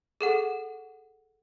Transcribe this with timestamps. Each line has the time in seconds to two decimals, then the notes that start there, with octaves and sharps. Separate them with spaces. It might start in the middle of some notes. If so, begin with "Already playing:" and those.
0.21 G#4 A4 F#5